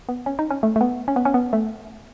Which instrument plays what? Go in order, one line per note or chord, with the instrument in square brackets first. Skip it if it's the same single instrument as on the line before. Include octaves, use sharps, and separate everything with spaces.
[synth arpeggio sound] B3
C#4
D#4
C#4
A3
A3
B3
C#4
B3
C#4
B3
A3